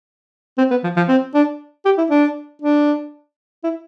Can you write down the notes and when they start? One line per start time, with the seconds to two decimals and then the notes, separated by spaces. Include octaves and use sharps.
0.58 C4
0.71 B3
0.83 F3
0.96 F3
1.08 C4
1.34 D4
1.85 G4
1.98 E4
2.10 D4
2.62 D4
3.63 E4